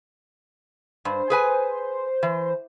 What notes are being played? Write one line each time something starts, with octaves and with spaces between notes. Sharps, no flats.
G2 C5
G#4 B4 G#5
E3